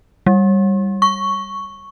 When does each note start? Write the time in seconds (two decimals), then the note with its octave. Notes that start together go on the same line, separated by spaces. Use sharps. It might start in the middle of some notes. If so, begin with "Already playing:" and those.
0.26 G3
1.02 C#6